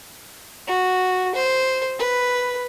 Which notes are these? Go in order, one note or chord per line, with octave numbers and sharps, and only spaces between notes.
F#4
C5
B4